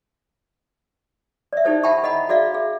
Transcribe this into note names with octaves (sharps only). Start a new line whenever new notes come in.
D5 E5
D#4 E4 G4 A4 C5 D5
E5 F#5 G5 A5 B5 C#6
A4 D#5 F#5 A#5 B5
F#4 G#4 D5 E5 F5
G#4